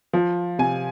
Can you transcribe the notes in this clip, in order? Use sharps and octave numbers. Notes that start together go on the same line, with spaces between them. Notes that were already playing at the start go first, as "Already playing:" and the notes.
F3
C3 G#5